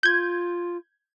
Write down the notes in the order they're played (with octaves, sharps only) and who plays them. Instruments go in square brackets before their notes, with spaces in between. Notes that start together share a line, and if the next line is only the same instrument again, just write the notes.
[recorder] F4 [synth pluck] G6 G#6